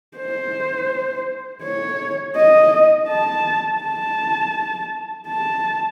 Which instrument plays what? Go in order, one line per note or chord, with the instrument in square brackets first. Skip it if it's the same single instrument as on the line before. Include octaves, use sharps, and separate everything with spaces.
[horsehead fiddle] C5
C#5
D#5
A5
A5
A5